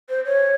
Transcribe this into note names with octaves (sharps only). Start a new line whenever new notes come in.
C5
C#5